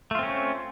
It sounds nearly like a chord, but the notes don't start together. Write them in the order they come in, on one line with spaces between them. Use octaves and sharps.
A3 F4 C4 C#4